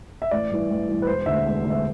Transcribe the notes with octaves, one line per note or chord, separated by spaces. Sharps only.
E5
A1 D5
G2 E3
A1
G2 E3
B4
E1 C5
D2 D3 E5
E1
D2 D3
E5